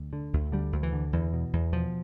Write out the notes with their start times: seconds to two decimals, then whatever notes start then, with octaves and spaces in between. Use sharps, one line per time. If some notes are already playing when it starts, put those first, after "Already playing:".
Already playing: D2
0.13 D3
0.33 D2
0.52 D3 G3
0.72 D2
0.83 E3
0.93 D3
1.13 E2 E3
1.33 B2
1.53 E2
1.73 B2 F3